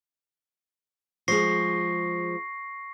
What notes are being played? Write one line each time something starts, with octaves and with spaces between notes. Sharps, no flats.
F3 G#3 G#4 C#6 A#6 C7